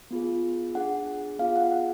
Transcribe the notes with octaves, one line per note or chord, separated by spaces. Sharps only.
B3 F4 G#4
D4 G#4 F#5
B3 F4 G#4 F5
F#5
F#5